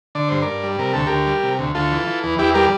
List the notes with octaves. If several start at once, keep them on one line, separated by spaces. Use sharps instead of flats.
D3 D5
G2 C5
A#4 D5
G2
G3
C3 A#4
D2 A4
D2 G4 A#4
G3
C3
D2
D2 F4 A4
E3
E3
E2
E2 E4 G4
G3 G4 A#4